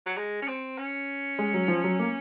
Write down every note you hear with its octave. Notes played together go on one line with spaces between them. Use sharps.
F#3
G#3
C#4
C4
C#4
G#3
F#3
F3
F#3
A#3